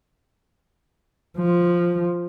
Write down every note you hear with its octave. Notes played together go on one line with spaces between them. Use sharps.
F3